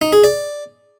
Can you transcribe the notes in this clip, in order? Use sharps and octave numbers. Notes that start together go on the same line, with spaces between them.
D#4
G#4
D5